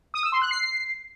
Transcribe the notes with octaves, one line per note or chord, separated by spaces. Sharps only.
D#6
E6
C6
F#6
C7